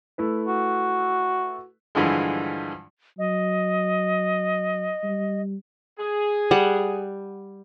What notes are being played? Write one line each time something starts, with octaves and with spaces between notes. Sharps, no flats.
A3 E4 B4
F#4
G2 D3 E3 F3 G#3
F#3 D#5
G3
G#4
G3 F#5